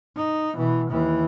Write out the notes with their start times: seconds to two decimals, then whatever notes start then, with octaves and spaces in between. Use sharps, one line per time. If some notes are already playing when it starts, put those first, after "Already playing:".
0.16 D#4
0.56 B2 E3
0.91 D#2 E3